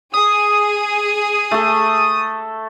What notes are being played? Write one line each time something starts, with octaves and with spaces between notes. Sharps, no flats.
G#4 D#6
A3 A4